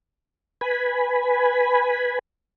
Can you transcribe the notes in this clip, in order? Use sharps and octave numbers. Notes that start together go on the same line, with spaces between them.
B4 G#5 B5